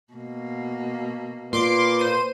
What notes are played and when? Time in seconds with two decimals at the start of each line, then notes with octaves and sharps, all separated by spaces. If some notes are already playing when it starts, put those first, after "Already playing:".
0.13 B2 A#3
1.53 A#2 B4 C6 D6
1.99 C5 D#7